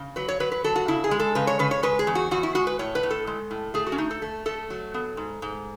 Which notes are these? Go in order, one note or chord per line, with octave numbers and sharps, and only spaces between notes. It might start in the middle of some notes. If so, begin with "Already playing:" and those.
Already playing: C#3
F#3 B4
C#5
F#3 B4
B4
F#3 A4
F#4
C#3 E4
G#4
G#3
A4
C#3 B4
C#5
C#3 B4
C#5
G#3 B4
G#4
E2
F#4
E2 F#4
E4
G#3 F#4
B4
A2 C#5
B4
A2
A4
G#3
A2
A3 G#4
F#4
C#4
A3 D#4
A4
A3
A3 A4
F#3
B3
G#2
G#2